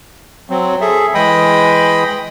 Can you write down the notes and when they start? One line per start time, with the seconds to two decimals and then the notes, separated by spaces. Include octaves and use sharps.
0.50 F#3 C4
0.81 G#4 A4 E5
1.14 E3 G#3 D#5 G5 B5 D#6